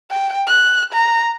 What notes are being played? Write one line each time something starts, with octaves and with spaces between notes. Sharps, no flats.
G5
F#6
A#5